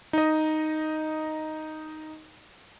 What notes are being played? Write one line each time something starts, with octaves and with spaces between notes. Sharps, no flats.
D#4 D#5